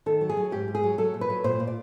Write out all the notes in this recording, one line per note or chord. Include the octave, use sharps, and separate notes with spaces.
D#3 A4
F#3
G#4
F#3
G#2 G4
G#2
G#4
F#3
F#3 A4
A#2
B4
F#3
A#2 C5
A#2
D5